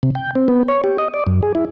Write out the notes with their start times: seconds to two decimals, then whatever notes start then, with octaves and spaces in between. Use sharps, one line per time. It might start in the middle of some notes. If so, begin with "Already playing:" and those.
0.03 C3
0.15 G5
0.35 C4
0.48 B3
0.68 C#5
0.84 G4
0.98 D#5
1.14 D5
1.27 F#2
1.43 G#4
1.55 E4